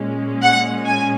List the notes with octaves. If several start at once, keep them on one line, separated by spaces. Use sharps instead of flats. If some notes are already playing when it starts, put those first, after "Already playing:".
Already playing: A#2 G#3 C#4
F#5
G#5